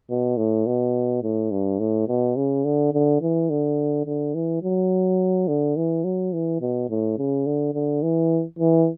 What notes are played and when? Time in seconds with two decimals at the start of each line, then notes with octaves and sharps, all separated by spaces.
0.10 B2
0.37 A2
0.67 B2
1.23 A2
1.51 G2
1.79 A2
2.08 B2
2.36 C#3
2.64 D3
2.93 D3
3.21 E3
3.50 D3
4.06 D3
4.35 E3
4.63 F#3
5.48 D3
5.76 E3
6.04 F#3
6.33 E3
6.61 B2
6.89 A2
7.18 C#3
7.46 D3
7.74 D3
8.03 E3
8.59 E3